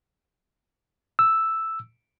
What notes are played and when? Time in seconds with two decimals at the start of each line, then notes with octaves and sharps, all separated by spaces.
1.19 E6